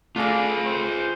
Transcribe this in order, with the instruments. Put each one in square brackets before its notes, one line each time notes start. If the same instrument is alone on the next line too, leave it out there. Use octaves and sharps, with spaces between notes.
[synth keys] A3 A4 A#6 [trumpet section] D4 D5 F5 [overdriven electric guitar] F4 G#4
[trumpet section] C4 C5